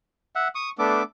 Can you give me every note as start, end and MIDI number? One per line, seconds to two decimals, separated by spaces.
0.35 0.48 76
0.35 0.48 78
0.55 0.72 85
0.55 0.69 87
0.79 1.02 57
0.79 1.02 59
0.79 1.02 62
0.79 1.04 69
0.79 1.04 86